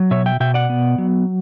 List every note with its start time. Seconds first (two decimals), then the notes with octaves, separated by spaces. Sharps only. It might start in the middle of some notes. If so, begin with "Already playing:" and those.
Already playing: F#3
0.11 B2 C#5 E5
0.26 E5 G5
0.40 B2 E5 G5
0.54 D5 F#5
0.70 B3
0.98 F#3